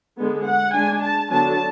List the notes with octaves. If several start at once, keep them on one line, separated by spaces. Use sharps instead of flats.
D3 G#3 B3
F#5
G#3 D4 G#5
A5
D3 F#3 B3 D4 A5